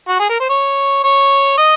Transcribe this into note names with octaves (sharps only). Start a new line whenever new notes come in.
F#4
G#4
A#4
C5
C#5
C#5
D#5